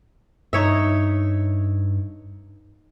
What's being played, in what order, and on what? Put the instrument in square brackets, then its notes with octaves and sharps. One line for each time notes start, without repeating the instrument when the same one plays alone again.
[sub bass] G2 [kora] D#4 C#5 E5